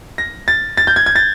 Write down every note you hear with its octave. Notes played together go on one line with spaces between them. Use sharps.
A#6
A6
A6
G6
G#6
G#6
A6